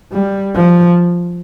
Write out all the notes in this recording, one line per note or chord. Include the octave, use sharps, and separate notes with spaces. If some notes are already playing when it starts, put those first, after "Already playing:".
G3
F3